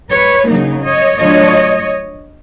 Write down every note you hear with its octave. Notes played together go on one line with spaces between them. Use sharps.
B4 C#5
C#3 F#3 A#3 D#4
C#5 D#5
D3 F#3 A3 D4 F4 C#5 D#5